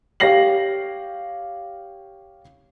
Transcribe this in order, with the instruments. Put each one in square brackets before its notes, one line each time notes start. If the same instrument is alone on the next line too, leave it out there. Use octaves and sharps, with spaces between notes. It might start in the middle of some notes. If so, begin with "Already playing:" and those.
[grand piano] G4 C#5 F5 A#6 C7 F#7